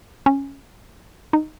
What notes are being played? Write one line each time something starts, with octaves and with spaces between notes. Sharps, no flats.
C#4
D#4